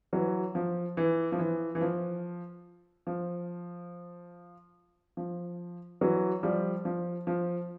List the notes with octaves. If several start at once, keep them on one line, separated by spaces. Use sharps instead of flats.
E3 F#3
F3
E3
F3
E3
E3
F3
F3
F3
E3 F#3
F3 G3
F3
F3